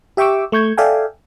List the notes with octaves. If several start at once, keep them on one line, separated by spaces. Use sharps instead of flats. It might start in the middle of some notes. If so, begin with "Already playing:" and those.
G4 E5 G5 C#6 D6 E6
A3 C#6 G6 G#6
A4 D5 E5 F5 G5 G#5